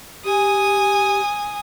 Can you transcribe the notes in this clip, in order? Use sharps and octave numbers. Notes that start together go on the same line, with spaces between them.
G4 G#5 D#6